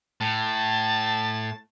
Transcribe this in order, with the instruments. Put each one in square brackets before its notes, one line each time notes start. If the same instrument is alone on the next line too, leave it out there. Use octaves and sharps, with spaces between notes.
[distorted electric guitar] A2 [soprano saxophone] A5